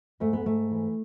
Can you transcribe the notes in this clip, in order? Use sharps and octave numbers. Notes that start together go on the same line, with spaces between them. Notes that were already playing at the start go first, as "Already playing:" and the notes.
G#2 A3
B3
G#2 A3
E3